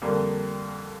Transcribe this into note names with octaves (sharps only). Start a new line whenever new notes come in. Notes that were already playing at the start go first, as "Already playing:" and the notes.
F2 D3 G3 A#3